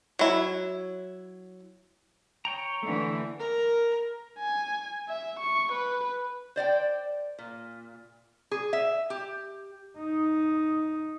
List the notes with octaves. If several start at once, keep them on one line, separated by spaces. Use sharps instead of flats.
F#3 E4
C#5 G5 A#5
D3 E3 A3
A#4
G#5
E5
C#6
B4
C5 D5 F#5 G5
A#2
G#4
E5
G4
D#4